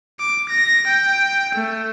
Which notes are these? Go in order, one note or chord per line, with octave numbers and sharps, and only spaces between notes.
D6
A#6
G5
A3